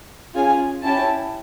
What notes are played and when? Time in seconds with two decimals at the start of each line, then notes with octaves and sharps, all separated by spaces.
0.35 C#4 F4 G#4 G#5
0.83 C#4 E4 G4 A5